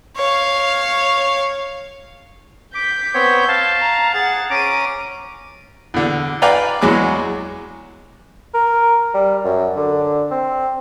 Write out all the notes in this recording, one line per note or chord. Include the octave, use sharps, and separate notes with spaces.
C#5 F5
D6 G6 B6
B3 C4 C#5
F5 A5
A#5
G#4 F#5 A6
C#4 A#5 D6 D7 D#7
E2 D3
B4 D5 F5 G5 G#5 A#5
E2 F#3 G#3 G#5 D6
A#4
G3
F#2
D3
C4